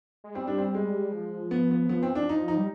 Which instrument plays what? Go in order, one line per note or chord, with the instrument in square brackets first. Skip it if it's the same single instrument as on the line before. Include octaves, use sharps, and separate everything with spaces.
[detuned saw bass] G#3
[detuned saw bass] G3 [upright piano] C4
[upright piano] D4
C4
G#3
[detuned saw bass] F3
[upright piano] B3
B3
[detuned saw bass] F3 [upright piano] B3
[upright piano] C4
D4
D#4
D#4
[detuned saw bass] G3